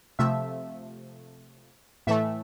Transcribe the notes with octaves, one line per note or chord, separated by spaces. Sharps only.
C3 F3 A3 E5
A2 E3 A3 E5